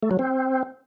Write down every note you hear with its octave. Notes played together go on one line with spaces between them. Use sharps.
A3
F#3
C4